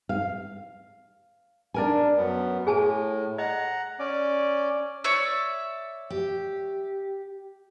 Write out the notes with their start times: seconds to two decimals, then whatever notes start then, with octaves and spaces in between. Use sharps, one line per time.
0.09 F5
1.74 D4 A#4 G#5
2.17 F#2 B3
2.67 A2 G#4 G#5 A5
3.38 D#5 F#5 A#5
3.99 C#4 D5
5.04 C#5 D5 E5
6.10 G4